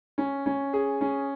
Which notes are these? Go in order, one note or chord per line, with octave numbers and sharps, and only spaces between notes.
C#4
C#4
G#4
C#4